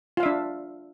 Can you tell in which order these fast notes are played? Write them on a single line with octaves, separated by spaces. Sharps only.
F4 F5 E5 D4